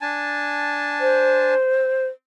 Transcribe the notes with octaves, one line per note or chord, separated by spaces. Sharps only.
D4 G#5 A5
C5